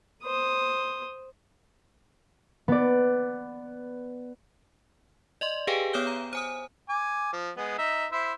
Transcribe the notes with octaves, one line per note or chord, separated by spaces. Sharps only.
C5 D#6
B3 D5
D5 D#5 C6
G4 G#4 B4 F5 G5 G#5
B3 C#5 D#6 F6 G6 G7
A#5
C5 G#5 D#6
G#5 D6
F3
G#3 B3
D#4 E5
E4 C5 E5